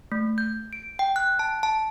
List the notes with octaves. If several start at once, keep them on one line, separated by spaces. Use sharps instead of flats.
A3
G6
D7
G5
F#6
A5
A5